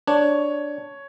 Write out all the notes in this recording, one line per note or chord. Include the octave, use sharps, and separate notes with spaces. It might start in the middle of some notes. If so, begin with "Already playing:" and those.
D4 C#5